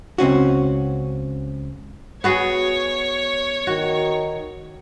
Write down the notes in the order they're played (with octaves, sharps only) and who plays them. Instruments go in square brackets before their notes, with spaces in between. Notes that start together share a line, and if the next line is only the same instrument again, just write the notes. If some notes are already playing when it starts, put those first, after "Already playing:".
[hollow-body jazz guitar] C#2 C4 C#4 F#4
[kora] B3 F#4 G#4 [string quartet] C#5
[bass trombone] D#3 [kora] F#4